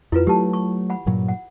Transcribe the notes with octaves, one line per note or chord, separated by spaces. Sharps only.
F2 E4 F4 B4
F#3 A3 G4 A5
C#6
F#5 B5
G2 A#2 F#3
F#5